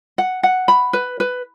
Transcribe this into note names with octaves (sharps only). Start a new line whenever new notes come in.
F#5
F#5
B5
B4
B4